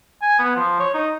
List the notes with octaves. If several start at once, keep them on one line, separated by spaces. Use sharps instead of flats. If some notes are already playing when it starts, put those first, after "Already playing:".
G#5
B3
F3
C#5
D#4